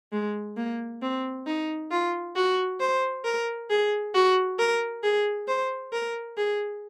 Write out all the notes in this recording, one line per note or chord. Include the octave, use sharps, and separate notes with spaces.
G#3
A#3
C4
D#4
F4
F#4
C5
A#4
G#4
F#4
A#4
G#4
C5
A#4
G#4